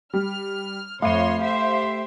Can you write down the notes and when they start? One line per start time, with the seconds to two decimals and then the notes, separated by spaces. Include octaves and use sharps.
0.14 G3 F6
1.02 F2 A3 C#5 F5 C6 D#7
1.42 G4 C5 E5